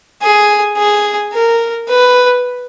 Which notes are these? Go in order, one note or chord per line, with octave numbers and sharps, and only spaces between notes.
G#4
G#4
A#4
B4